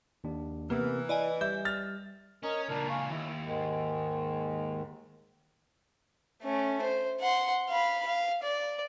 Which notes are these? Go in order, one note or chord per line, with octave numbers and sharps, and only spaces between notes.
D#2 D4
C3 E3 A#3 B3 A#4
E4 D5 D#5 G#5
G3 E5 G6
F6 A6
C#4 A#4 D#5
C#2 A#2 D4 A#4
F5 G#5 C#6
D#2 E4
G#2 D#3 G#3
A3 C#4
C5
F#5 C6
F5 B5
F5
D5